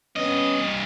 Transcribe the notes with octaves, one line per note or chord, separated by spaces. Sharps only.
G2 B3 C#4 D#5